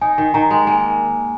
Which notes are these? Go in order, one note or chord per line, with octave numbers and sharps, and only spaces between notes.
D#4 G#5
D#3
D#3 A#5
G#3
A#3 G#5